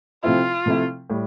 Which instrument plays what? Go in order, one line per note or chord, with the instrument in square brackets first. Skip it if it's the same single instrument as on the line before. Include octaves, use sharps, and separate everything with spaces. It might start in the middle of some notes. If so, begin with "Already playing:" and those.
[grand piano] C3 F3 A3 C4 E4 [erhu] F4
[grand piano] C3 F3 A3 C4 E4
A2 G3